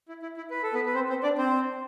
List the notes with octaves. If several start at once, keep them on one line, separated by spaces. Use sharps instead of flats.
E4
E4
E4
B4
A4
B3 B4
B4
C4 C5
C4 C5
D4 D5
C4 C5